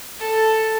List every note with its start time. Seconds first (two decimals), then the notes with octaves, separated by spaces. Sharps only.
0.19 A4